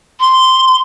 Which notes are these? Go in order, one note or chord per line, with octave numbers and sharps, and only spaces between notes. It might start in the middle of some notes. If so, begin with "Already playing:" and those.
C6